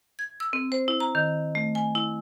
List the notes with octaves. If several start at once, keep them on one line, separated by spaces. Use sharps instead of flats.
G#6
E6
C4
C5
E4
A#5
D#3
A3
G#5
E4